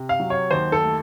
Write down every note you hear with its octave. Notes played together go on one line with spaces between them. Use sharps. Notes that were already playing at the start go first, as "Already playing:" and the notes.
Already playing: C3
F5
F#3
C#5
D#2 C5
A4
A3